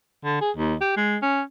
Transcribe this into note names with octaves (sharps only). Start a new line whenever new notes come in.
D3
G#4
D#2
G4
G#3
C#4